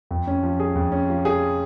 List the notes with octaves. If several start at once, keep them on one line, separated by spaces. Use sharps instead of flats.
F2
C#4
F3
G#4
F2
C#4
F3
G#4